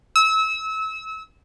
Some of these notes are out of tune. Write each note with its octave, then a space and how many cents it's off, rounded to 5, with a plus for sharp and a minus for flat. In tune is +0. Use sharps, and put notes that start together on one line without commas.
E6 -30